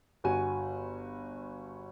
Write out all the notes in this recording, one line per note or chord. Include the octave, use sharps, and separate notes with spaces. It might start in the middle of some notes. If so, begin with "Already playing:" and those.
G1 F#4 G#5 D#7